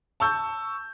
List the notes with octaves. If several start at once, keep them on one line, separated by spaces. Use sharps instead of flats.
A5 C#6 E6 G6